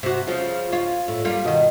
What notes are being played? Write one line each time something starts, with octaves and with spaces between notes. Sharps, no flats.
C3 F#4
C#3 F3
F4 C#5
A2
G3 A#3 F4
B2 D#3